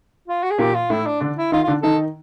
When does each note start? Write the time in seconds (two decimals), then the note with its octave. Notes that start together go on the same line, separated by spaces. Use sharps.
0.28 F4
0.43 F#4
0.50 G#4
0.58 A#2 A#3 G4
0.74 F4
0.90 A2 A3 E4
1.06 D4
1.20 D3 D4
1.37 E4
1.52 D#3 D#4 F4
1.63 F4
1.68 D3 D4
1.83 D#3 D#4 A4